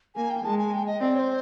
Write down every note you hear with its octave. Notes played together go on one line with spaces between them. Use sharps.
A#3 G#5
G5
G#3 A5
G#5
G5
D#5
C4 D5
C#5
C5